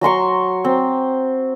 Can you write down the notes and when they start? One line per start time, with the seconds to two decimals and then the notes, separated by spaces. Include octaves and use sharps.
0.01 F#3 A#5 C6 C#6
0.65 C4